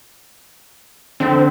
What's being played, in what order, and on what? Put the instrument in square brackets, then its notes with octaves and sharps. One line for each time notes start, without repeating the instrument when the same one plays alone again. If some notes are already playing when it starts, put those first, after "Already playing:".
[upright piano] D3 [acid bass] C4